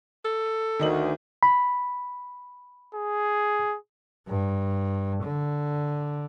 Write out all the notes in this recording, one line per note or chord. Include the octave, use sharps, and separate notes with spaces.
A4
D2 D#3 D#5 F#7
B5
G#4
G2
D3